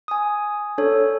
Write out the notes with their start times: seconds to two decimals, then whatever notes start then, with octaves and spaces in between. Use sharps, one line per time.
0.08 G#5 D#6
0.78 D4 A4 C#5